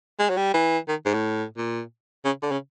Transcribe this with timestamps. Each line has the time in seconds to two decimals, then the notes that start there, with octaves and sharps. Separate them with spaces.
0.19 G#3
0.29 F#3
0.37 G3
0.54 E3
0.88 D#3
1.05 G#2
1.13 A2
1.57 A#2
2.25 C#3
2.42 D3
2.51 C#3